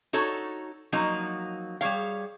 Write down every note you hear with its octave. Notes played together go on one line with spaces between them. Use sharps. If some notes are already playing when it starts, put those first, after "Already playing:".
D#4 F#4 A4 C#5
F3 F#3 A#3 D#4
G3 G#4 C#5 F5